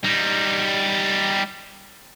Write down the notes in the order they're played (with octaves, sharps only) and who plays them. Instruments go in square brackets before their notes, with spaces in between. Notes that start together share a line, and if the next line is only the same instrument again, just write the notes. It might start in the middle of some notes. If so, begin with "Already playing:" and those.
[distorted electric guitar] G3 D#4